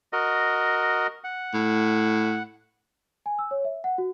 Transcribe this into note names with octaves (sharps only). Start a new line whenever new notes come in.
F#4 A#4 D#5
F#5
A2
G#5
E6
C#5
E5
F#5
F#4